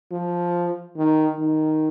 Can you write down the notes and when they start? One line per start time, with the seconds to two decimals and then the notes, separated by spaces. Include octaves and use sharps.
0.11 F3
0.97 D#3
1.39 D#3